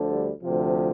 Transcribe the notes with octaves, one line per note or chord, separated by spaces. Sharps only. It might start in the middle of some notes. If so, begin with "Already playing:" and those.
Already playing: D2 D3 F3
G3
D2 C3 F3